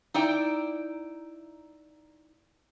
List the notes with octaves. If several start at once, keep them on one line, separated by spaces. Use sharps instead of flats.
D#4 E4 D5 G5